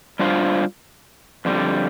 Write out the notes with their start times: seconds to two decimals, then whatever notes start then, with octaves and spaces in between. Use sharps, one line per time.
0.19 G3 D4 F4 C5 F5
1.45 F2 D3 G3